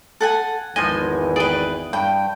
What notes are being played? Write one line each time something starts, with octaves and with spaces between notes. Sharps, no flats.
A4 F#5 G#5
G#1 E2 F3 G#3 D#5 G#5
G#4 B4 D5 G5
G2 G5